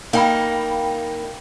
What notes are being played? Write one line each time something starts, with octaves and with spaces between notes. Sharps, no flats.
A#3 D#4 F5 G5 B5